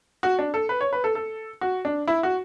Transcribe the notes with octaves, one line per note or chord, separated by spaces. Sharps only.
F#4
D4
A4
B4
C#5
B4
A4
A4
F#4
D4
E4
F#4